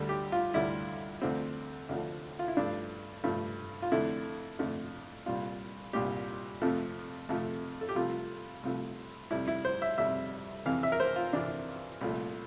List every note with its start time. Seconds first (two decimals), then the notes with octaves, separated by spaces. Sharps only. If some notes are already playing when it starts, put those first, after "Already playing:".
Already playing: D2 D3 G3 A4
0.09 G4
0.32 F4
0.54 D2 D3 G3 E4
1.22 D2 D3 F3 A3 C4
1.89 D2 D3 F3 A3
2.39 F4
2.48 E4
2.57 G2 F3 A3 D4
3.24 G2 F3 A3
3.82 F4
3.92 F2 D3 A3 E4
4.59 F2 D3 A3
5.26 C2 A#2 G3 F4
5.93 C2 A#2 G3 G4
6.62 F2 C3 F3 A3
7.29 F2 C3 F3 A3
7.81 A4
7.89 G4
7.96 C2 C3 F3 A3 F4
8.63 C2 C3 F3 A3
9.31 F2 C3 G3 E4
9.48 E4
9.65 C5
9.82 E5
9.98 F2 C3 G3 E5
10.66 F2 C3 E3 F5
10.83 E5
10.92 A#4
11.00 C5
11.16 F4
11.33 F2 C3 E3 D4
12.01 C2 A#2 F3 A3